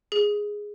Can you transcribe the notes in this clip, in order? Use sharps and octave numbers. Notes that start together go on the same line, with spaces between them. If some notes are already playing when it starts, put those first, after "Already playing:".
G#4